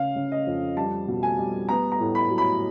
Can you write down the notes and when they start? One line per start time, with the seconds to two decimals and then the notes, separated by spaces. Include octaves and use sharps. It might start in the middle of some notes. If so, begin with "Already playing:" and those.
Already playing: C#3 F5
0.16 C#3
0.32 D#5
0.47 F2
0.77 G3 A5
1.08 B2
1.23 G#5
1.39 G3
1.69 B3 A#5
1.92 A#5
2.00 A2
2.15 B5
2.30 F#3
2.38 B5